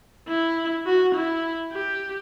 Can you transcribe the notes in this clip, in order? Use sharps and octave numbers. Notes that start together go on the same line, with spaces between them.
E4
F#4
E4
G4